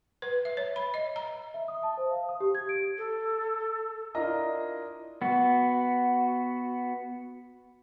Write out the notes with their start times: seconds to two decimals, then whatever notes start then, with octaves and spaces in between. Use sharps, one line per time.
0.22 B4
0.45 E5
0.57 C#5
0.76 B5
0.94 D#5
1.16 A#5
1.54 E5
1.68 D#6
1.83 A5
1.97 C5
2.11 F5
2.29 D#6
2.40 G4
2.55 G#6
2.69 D7
2.98 A4
4.15 D4 E4 F4 A#4 D#5 A#5
5.22 B3 F#4